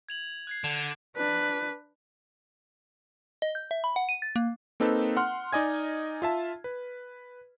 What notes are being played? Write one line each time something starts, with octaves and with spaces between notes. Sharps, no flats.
G#6 F7 F#7
F#6 G#6 C7
D3
D4 B4
D#5
G6
E5
B5
F#5
D#7
A6
A#3
A#3 C4 D#4 A4 B4
F#5 C6 F6
D#4 D5 D#5 G#5 G#6
F4 E5 A5
B4